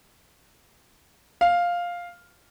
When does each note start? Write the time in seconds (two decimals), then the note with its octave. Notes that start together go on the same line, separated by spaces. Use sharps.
1.41 F5